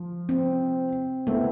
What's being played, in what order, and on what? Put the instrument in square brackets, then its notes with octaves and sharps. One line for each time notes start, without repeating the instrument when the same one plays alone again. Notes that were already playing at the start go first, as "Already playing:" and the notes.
Already playing: [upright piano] F3 F4
[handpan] C4
[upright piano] A3 C4 E4 [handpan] B3